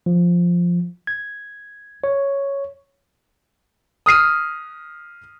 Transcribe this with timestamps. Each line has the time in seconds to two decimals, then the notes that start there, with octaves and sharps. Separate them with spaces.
0.06 F3
1.07 G#6
2.04 C#5
4.06 D#6 F6 C7 D#7